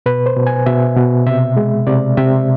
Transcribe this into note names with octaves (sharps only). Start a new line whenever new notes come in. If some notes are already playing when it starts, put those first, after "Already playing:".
B2 B4
C5
B2
G#5
B2 E5
B2
C3 E5
G#3
C3 D5
C3 E5